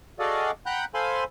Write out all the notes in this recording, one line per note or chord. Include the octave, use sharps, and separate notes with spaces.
F#4 G#4 A4 D5 D#5 F5
F#5 G5 A#5 B5 F#6 G6
A4 C5 F5 G#5 B5 C6